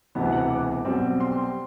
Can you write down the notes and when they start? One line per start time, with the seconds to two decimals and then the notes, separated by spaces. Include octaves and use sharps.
0.15 E1 D2 C3 E3 B3
0.32 F#5
0.50 D6
0.85 B1 B2 G3 C4
1.20 C6